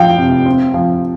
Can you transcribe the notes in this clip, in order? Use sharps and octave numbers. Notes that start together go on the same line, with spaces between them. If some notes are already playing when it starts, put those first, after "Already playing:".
Already playing: F3 F5 G5
C3
C4
F3